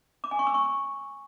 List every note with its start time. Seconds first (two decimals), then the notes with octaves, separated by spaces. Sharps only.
0.24 D6
0.31 G#5
0.39 C#6
0.47 E6
0.54 C#6